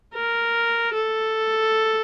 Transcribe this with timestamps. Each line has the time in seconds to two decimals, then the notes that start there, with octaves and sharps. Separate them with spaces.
0.15 A#4
0.94 A4